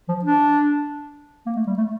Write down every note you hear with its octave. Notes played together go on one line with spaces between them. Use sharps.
F3
D4
A#3
A3
G3
A3